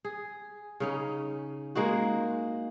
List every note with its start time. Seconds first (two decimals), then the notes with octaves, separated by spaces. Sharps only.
0.05 G#4
0.80 C#3 C#4 D#4
1.75 G#3 A#3 D#4 F#4